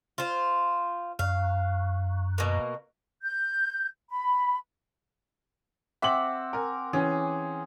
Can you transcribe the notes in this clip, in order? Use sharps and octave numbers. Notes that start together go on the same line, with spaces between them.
F4 C5
F#2 F5
B2 A#3
G6
B5
C4 E5 F#5 D6 F#7
A#4 G#5
E3 C#4 G#4